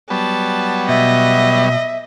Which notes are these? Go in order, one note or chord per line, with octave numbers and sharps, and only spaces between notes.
F#3 G3 B3 A5
B2 D#5 E5